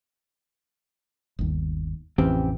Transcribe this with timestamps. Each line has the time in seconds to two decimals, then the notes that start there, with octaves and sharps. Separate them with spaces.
1.39 G1 D#2
2.18 A1 F2 C#3 E3 C4 G4